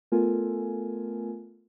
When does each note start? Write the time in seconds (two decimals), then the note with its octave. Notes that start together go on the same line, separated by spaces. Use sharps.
0.12 A3 B3 F4 A4 A#4 G#5